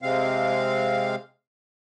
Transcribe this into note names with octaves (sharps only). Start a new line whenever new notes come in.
C3 G#3 C4 F5